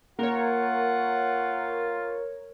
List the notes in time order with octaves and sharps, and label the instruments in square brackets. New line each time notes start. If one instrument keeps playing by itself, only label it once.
[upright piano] A#3 [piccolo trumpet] F4 [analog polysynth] A#4 C#5 [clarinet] F#5